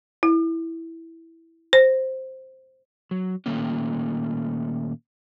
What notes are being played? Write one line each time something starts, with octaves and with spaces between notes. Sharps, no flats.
E4
C5
F#3
A#2 D#3 A3 A#3 C#4